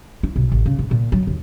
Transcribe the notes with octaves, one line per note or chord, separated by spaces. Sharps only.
E4
B1
A1
C#3
G#2
A#2
F#3
D#2